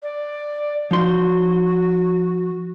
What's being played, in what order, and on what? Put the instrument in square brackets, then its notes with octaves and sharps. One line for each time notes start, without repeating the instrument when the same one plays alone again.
[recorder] D5
[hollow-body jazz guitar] F3 D#4 C6 [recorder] F#4